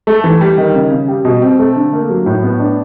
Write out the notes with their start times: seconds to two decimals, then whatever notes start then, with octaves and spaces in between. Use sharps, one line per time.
0.07 A3
0.24 E3
0.41 G3
0.58 D#3
0.75 C#3
0.92 C#3
1.08 G3
1.25 B2
1.42 C4
1.59 A3
1.76 D3
1.93 A#3
2.10 F#3
2.26 A2
2.43 B3
2.60 D4